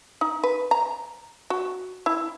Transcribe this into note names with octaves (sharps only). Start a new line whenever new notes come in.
D#4
B4
A#5
F#4
E4